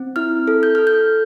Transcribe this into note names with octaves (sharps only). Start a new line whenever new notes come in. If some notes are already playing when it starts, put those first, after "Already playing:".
Already playing: C4
E4 F6
A4
G6
A4 F6
G6